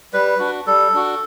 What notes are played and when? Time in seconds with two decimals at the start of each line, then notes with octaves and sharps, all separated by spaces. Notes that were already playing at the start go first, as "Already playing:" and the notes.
0.13 G3 B4
0.39 D4 F#4
0.67 G3 A4
0.94 D4 F#4